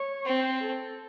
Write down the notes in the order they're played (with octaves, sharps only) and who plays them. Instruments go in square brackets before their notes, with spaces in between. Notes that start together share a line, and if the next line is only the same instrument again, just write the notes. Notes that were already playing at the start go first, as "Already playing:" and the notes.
Already playing: [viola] C#5
[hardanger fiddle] C4 [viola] C5
[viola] A4